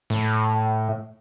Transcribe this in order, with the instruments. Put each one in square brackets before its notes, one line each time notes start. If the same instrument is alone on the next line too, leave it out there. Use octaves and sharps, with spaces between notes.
[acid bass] A2